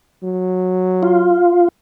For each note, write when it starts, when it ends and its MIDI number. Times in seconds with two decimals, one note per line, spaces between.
0.23 1.41 54
1.03 1.68 65